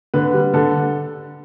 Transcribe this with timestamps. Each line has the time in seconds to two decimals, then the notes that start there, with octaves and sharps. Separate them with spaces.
0.14 D3 B4
0.34 G3
0.54 D3 A4